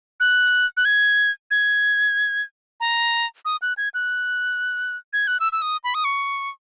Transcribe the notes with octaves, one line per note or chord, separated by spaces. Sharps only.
F#6
F#6
G#6
G#6
A#5
D#6
F#6
G#6
F#6
G#6
F#6
E6
E6
D#6
B5
D#6
C#6